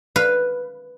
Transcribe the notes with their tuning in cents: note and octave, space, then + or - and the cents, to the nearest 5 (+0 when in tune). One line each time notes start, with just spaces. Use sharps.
B4 +0 F5 +0